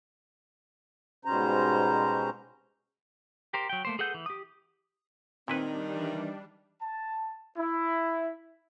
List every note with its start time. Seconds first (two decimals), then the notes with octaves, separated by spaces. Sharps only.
1.25 G#2 B2 G3 C#4 C5 A#5
3.53 G4 A#4 C5
3.69 F#3 G5
3.85 A3 A#3 C5
3.99 G#4 A4 B4 F#5 G6
4.14 E3
4.26 G4 D#6
5.48 A#2 D#3 G3 C4 D4 E4 B4
5.94 E3
6.81 A5
7.58 E4